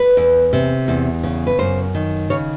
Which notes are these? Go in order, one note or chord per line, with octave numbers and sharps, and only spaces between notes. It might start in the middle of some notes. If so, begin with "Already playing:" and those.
Already playing: B4
E2
C3
E2
C#3
B4
F#2 C5
D#3
C#3 C#5